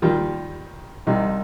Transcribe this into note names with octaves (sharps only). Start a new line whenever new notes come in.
D#2 D#3 G3 F4
C2 C3 G3 D#4